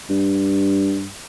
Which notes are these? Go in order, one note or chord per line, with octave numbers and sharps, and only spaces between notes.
G2